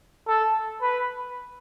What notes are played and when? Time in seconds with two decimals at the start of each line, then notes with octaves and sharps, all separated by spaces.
0.28 A4
0.82 B4